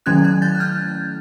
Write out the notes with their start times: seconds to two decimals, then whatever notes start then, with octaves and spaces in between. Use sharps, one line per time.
0.06 D#3 F#3 A3 C#4 E4 F#6 G#6
0.24 F#6 G#6
0.42 G6 A6
0.55 F#6
0.60 F6 G6